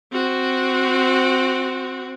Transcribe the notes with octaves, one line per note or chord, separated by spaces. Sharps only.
C4 F#4